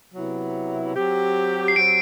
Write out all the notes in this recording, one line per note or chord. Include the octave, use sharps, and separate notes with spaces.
C3 F#3 B3 E4
F#3 C4 G4
C7
F#3 C4 G4 D7